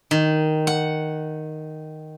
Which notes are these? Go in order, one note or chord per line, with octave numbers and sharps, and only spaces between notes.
D#3
F#5